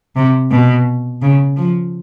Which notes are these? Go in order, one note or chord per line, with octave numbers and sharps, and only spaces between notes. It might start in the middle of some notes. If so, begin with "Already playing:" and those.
C3
B2
C#3
F3